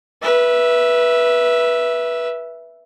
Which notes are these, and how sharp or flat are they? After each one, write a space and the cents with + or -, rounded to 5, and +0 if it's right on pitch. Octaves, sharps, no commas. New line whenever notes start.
B4 -20 E5 +0